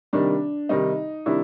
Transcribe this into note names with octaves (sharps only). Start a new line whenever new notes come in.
C3 D#3 G3 D4
C3 D#3 G3 D#4
C3 D#3 G3 D4 E4